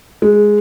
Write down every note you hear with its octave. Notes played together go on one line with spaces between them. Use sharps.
G#3